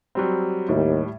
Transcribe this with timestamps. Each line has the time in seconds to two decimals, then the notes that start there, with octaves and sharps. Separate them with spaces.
0.15 F#3 G3 C4
0.69 D#2 A2 G3